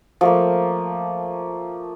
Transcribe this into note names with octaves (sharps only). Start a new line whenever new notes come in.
F3 A3 A#3